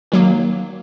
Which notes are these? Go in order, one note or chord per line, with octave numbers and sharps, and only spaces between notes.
D#3 F#3 A#3